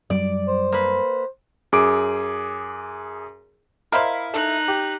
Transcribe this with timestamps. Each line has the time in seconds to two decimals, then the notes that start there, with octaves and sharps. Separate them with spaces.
0.10 F#2 F#3 G3 D5
0.47 C5
0.72 A#3 B4
1.72 F#2 G#4 D6 D7
3.92 E4 A#4 C5 D#5 F5 B5 B6
4.34 D#4 A4 F#6
4.68 G4